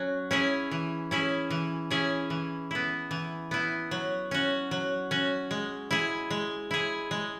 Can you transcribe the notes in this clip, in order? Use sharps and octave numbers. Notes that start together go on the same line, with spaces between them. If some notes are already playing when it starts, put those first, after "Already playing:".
Already playing: F#3 C#4
C#4 E4 G#4
E3
C#4 E4 G#4
E3
C#4 E4 G#4
E3
B3 E4
E3
B3 E4
F#3
C#4 F#4
F#3
C#4 F#4
G#3
E4 G#4
G#3
E4 G#4
G#3